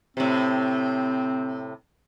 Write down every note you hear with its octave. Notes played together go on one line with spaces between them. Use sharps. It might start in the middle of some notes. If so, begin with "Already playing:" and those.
A2 C3 C4